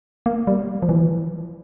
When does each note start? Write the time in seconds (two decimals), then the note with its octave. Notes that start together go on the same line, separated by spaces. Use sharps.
0.26 A#3
0.47 G3
0.82 F3
0.89 E3